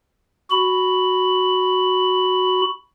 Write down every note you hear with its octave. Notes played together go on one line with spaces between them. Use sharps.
F#4 B5